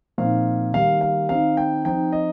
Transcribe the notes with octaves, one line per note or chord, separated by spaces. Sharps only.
A#2 F3 C4 D#4 F5
D#3 G3 A#3 F5
F5
D#3 C4 D#4 F5
G5
F3 C4 D#4 G5
D#5